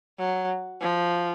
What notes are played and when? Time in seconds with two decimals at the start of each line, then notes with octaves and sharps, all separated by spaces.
0.19 F#3
0.82 F3